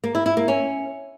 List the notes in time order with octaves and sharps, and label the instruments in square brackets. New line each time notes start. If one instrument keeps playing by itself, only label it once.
[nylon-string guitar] A#3
E4
E4
A#3
C#4